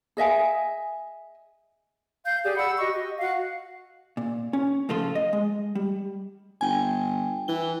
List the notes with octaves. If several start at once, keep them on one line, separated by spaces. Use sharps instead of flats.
G#4 D#5 E5 G#5
F5 G6
G4 G#4 D5
F#5 B5 E6
F#4 G4 D#5 C#6
D#5
F#4 F5 F#5
A#2
C#4
A2 C#3 F3 F4 A4 C6
D#5
G#3
G3
G1 G5 G#5
E3 G7